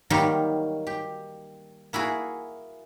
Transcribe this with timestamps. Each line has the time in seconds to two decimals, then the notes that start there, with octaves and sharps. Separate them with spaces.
0.10 D#3 F#3 G3 A#3 G4
0.87 G4
1.93 A#3 E4 F#4 G#4